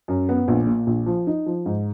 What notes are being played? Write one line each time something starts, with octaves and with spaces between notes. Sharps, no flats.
F#2
B3
A#1
A#2
A#1
F3
D#4
F3
G#2